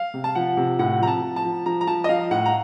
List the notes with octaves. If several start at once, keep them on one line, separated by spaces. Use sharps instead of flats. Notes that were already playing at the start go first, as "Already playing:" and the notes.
Already playing: F5
C3
A5
F3 F#5
C3
A2 F#5
F3 A#5
A5
F3
A5
F3
F3 A#5
A#5
F3 A5
D#5
F3 F5
A2 F#5
A#5